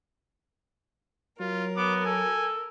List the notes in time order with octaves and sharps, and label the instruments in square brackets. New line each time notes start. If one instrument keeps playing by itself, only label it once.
[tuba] F#3 [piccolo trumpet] F4 [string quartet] A#4
[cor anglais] B3 [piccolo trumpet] D6
[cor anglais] A4 [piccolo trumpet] G#5